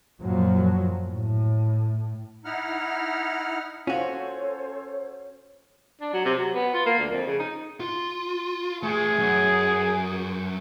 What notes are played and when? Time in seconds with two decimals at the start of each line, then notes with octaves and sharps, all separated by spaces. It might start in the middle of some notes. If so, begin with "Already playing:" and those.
0.21 F#2 A#2 F3 F#3
1.07 A2
2.45 D#4 E4 F#5 F6
3.87 C#4 F4 F#4 A4 C5 C#5
6.01 D4
6.13 F#3
6.25 C3
6.37 F#3
6.54 B3
6.74 F4
6.86 A#3
6.99 D2
7.10 F2
7.27 C#3
7.39 D#4
7.80 F4
8.83 A3 G#4 G#5
9.18 F#2